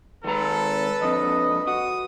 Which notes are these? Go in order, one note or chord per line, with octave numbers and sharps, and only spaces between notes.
D#3 G#3 A4 B4 A#5
F2 D3 D#5
F#4 D#6